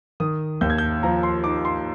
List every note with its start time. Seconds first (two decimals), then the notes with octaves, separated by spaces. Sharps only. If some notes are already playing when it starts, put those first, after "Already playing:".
0.20 D#3 D#6
0.61 D#2 G6
0.70 G#6
0.78 G6
1.03 F3 A#5
1.23 C6
1.44 D#4 D6
1.65 C6